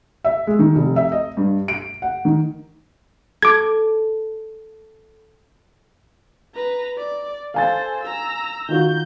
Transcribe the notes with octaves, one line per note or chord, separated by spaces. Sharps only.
E5
G#3
D#3
F1
E5
D#5
G2
D7
F#5
D#3
A4 D6 G#6
B4 A#5
D5
A4 C5 F5 G#5 A6
A#5 E6
D#3 F4 F#4 G6